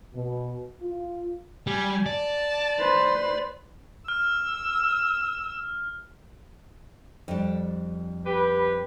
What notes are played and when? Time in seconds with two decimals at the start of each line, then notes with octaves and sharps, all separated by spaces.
0.15 B2
0.81 F4
1.67 G3 G#5
2.06 D5 A5
2.79 B4 C5
4.08 E6 F6
7.28 F2 G3 D4
8.26 G4 B4